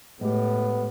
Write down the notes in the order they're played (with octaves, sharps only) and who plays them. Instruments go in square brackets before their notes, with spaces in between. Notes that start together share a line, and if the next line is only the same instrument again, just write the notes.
[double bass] A2 [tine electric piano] G#3 A3 G4 [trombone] B3